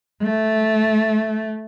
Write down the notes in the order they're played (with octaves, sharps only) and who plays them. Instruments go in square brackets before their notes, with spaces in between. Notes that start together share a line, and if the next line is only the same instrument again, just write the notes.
[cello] A3